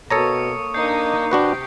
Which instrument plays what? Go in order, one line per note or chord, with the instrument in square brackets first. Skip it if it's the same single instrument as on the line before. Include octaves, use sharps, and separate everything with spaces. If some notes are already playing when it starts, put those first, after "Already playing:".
[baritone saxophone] B2 [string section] A#3 [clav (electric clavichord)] A4 C#5 A#5 [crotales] C#6 D#6 C#7
[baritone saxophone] A#3 [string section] D4 D#4 [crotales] G6 C7
[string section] C3 G4 [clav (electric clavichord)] D4 F#4 B4